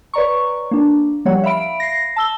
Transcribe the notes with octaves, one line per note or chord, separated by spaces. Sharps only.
B4 C#5 D5 A#5 C#6
A#3 D4
F3 G3 A#3 C#5 F#5
E5 F5 B5 D7
A#6 C7
A5 E6 G7